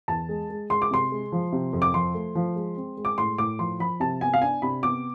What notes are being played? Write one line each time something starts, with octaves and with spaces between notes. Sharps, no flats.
E2 A5
G#3
G#3
G#3 C6
D6
C3 C6
G#3
F3
C3
F2
D6
F3 C6
A3
F3
G#3
C4
G#3
D6
A2 C6
A2 D6
F3 C6
F3 B5
C3 A5
B3 G#5
F5
D4 G#5
C3 B5
B3 D6